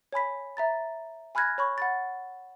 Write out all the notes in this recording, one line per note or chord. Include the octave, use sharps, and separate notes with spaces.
C#5 G#5 B5 B6
E5 A#5 A6
G#5 B5 F6 F#6 G#6 A#6
C#5 B5 C#6
F#5 B5 A6